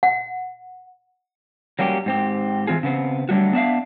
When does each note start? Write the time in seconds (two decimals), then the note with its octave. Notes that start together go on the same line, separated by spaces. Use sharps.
0.03 F#5
1.79 F#3 G3 A#3 C#4 G4
2.06 G#2 C4 G4
2.67 E3 C4 F4 G#4
2.83 C#3 B3 C4
3.29 D3 F#3 G3 A3 F#4
3.53 B3 D4 E5 F5